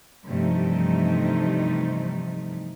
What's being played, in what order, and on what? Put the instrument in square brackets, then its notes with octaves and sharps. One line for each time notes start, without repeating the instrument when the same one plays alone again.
[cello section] G2 C3 E3 F3 A3 D#4